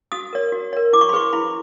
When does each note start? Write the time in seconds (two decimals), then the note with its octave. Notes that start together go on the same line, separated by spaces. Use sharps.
0.12 F#4 D#6
0.33 A#4 C#5
0.52 F#4
0.73 A#4 C#5
0.93 E4 D6
1.01 C#6
1.09 C6
1.13 G#4 B4 C#6
1.33 E4 B5